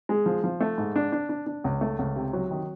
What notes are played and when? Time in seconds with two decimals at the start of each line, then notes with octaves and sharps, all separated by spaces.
0.09 G#3
0.26 F3
0.44 F3
0.61 A3
0.78 G#2
0.96 D4
1.12 D4
1.29 D4
1.46 D4
1.64 C#2
1.81 A3
1.99 C#2
2.16 C3
2.33 F#3
2.51 D#3